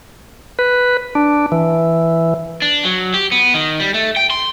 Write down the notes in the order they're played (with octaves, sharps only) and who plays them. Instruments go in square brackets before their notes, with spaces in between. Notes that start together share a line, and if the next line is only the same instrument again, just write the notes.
[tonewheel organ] B4
D4
E3
[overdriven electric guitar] D4
F#3
G4
B3
D#3
G3
A3
G5
C6